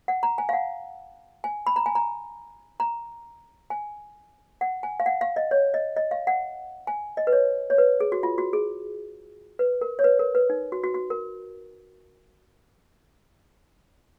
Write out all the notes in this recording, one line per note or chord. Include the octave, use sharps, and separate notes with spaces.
F#5
A#5
G#5
F5
F#5
G#5
B5
A#5
G#5
A#5
A#5
G#5
F#5
G#5
F5
F#5
F5
D#5
C#5
D#5
D#5
F5
F#5
G#5
D#5
B4
C#5
C#5
B4
G#4
F#4
F4
F#4
G#4
B4
A#4
C#5
B4
A#4
B4
D#4
F#4
F#4
F#4
A#4